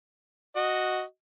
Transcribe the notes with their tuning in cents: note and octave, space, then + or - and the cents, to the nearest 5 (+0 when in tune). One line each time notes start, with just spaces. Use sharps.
F#4 +0 D#5 +0